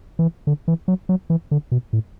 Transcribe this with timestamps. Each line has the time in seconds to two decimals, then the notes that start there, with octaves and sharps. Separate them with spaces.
0.19 E3
0.47 D3
0.68 E3
0.88 F#3
1.09 F#3
1.30 E3
1.51 D3
1.72 B2
1.93 A2